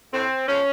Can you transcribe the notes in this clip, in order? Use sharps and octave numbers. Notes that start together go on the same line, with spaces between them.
A2 C4
F3 G#3 C#4